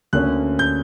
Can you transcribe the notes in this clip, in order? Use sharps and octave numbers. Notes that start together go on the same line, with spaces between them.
D2 D3 A#3 C#4 F#6
G6